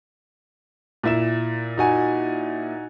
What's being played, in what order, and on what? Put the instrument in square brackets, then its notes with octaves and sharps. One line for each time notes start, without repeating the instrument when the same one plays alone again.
[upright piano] A#2 E4 E7
[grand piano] D#4 F#4 G#5